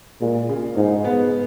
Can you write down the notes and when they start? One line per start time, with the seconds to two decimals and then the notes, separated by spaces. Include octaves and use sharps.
0.21 A#2 G#3
0.49 C#3
0.77 G#2 D#4
1.04 B3